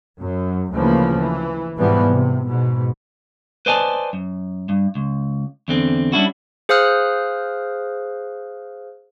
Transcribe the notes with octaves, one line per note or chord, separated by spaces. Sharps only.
F#2
D2 C#3 E3 F3 A#3
E3
G#2 B2 E3 F3 G3 B3
C3
G#2 B2
B4 C5 D5 D#5 G#5 A5
F#2
G2
C#2
E2 D3 C4
G3 C#4 D4 E4 F#4
G#4 C5 F5 D#6 F6 F#6